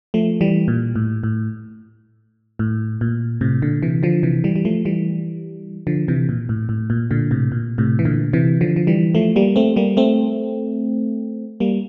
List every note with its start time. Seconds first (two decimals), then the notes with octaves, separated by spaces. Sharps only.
0.14 F3 A3
0.41 E3 G3
0.68 A#2
0.96 A2
1.23 A2
2.59 A2
3.01 A#2
3.41 A2 C3
3.62 A#2 D3
3.82 C3 E3
4.03 D3 F3
4.23 C3 E3
4.44 E3 G3
4.56 G3
4.65 F3 A3
4.85 E3 G3
5.87 D3 F3
6.08 C3 E3
6.29 A#2
6.49 A2
6.69 A2
6.90 A#2
7.11 A#2 D3
7.31 A2 C3
7.52 A#2
7.78 A2 C3
7.99 E3
8.05 A#2 D3
8.33 C3 E3
8.61 D3 F3
8.76 F3
8.87 E3 G3
9.15 F3 A3
9.36 G3 A#3
9.56 A3 C4
9.76 G3 A#3
9.97 A3 C4
11.60 G3 A#3